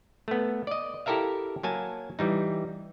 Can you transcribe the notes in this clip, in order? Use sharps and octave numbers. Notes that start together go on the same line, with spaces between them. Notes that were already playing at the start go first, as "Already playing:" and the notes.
A3 B3
D5 D#5
E4 G4 A4 A#4 E5 F5
F#3 A#3 G#5 A5
E3 G3 D#4